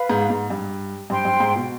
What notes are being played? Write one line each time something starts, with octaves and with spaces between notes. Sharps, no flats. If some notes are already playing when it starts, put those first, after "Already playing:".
Already playing: B4 F5 B5
G#2
G#2
G2
G2 C5 G5 C6
G2
G#2
B2